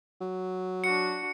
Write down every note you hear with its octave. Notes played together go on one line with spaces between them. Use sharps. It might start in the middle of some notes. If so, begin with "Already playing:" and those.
F#3
D4 F#4 C#7